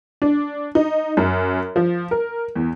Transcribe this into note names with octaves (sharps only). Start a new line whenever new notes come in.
D4
D#4
F#2
F3
A#4
E2